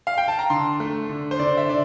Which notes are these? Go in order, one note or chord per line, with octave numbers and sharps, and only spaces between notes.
F5
G5
A5
A#5
D3 C6
A3
D3
C5
D3 D5
E5
D3 D5